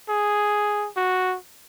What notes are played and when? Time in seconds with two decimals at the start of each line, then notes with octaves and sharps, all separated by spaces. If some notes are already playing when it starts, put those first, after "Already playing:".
0.09 G#4
0.97 F#4